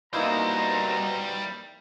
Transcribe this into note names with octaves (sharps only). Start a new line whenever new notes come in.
B2 G3 A#3 D#4 E4 C5 A#5